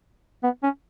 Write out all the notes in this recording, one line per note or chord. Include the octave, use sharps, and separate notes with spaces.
B3
C#4